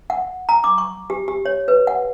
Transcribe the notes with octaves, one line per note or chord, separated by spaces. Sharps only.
F#5
A#5
D6
C#6
G4
G4
C#5
B4
F#5